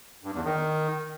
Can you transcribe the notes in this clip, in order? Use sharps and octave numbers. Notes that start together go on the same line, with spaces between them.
G2
E2
D#3